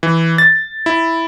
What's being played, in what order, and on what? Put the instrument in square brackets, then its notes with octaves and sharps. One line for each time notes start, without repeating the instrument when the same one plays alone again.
[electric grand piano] E3
A6
E4